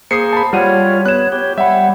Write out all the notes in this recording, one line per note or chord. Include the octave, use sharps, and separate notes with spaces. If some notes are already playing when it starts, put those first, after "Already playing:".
A#3 G#4 C5 D#6 C7 C#7
A5 B5
G3 F4 C#5 F#5 D#7
B3 C#5 F#6 E7
G4 C#5
G3 E5 F#5 B5